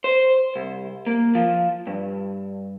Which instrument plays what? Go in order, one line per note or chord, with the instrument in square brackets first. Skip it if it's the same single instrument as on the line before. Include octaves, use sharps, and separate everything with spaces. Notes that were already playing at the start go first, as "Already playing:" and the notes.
[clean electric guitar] C5
C2
A#3
F3
G2